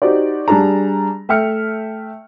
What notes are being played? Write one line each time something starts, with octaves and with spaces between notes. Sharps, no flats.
D#4 F#4 G4 C5 D5
G3 D4 G#4 A#5
A3 E5 G5 F6 C#7